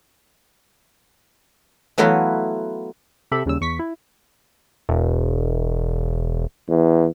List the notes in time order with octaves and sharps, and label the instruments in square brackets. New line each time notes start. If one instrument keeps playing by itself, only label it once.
[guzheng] E3 F#3 A3 B3 E4 F4
[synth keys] C3 G4 A4 E5 B5
D#2 C#3 G3 E6
E2 C#6 B6
E4
[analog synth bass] E1
[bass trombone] E2